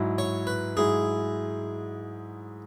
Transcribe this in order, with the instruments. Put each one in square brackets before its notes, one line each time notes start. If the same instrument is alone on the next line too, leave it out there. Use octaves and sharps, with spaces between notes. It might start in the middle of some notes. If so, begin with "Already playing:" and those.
Already playing: [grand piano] G#2 F#3 E4
[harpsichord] C#5
B4
[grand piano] G#2 F#3 E4 [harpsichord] G#4